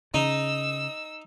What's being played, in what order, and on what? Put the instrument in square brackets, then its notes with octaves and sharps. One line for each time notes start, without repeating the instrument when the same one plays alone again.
[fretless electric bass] C#3 [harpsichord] D#4 [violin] E6